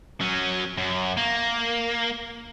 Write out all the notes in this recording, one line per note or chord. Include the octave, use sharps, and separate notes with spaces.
F#3 C#4
F#2
A#3